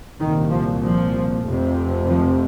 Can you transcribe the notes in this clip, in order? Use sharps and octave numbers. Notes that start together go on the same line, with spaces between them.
C2 A#2 D#3
F3
F3
F1 F2 C3
F3